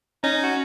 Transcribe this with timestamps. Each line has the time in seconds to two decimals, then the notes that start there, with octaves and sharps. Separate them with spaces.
0.23 C#4 D#4
0.43 F#4